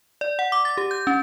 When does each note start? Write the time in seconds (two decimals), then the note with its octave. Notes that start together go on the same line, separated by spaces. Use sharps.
0.21 D5
0.39 F#5
0.52 D6
0.65 A6
0.78 G4
0.91 G6
1.07 C#4